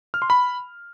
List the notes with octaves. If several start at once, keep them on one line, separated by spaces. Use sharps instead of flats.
F6
C6
B5